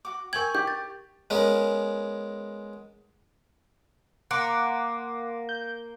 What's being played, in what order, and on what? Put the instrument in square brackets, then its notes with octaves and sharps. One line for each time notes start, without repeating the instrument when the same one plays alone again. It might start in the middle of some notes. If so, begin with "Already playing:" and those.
[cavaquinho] F#4 D6
[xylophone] A#4 G#6 [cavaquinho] G5 G#5 C#6 [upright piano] F#7
[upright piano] G4 [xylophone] G6
[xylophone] A6
[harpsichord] G#3 B3 C#4 A#4
[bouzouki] A#3 [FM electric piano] F#5 C6 D6
[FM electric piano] G6